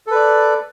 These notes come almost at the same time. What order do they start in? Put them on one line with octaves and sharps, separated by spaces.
A4 B4 D5